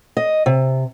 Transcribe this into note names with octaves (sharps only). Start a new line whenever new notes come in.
D#5
C3